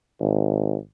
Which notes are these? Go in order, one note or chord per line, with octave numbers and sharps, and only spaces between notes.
G#1